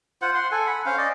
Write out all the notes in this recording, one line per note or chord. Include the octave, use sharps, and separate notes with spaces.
F4 C5 F#5
F#5 C6
A4 G#5
F#5 B5
C#4 C5 F5
D5 D#5